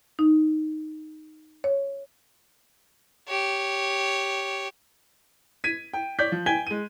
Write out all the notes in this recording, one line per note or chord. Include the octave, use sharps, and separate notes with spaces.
D#4
C#5
G4 C#5
G#6 B6 D#7
G5
C#5 D5 G6 B6
F3
G5 G#5 G#6 B6 G7
G#3 D#7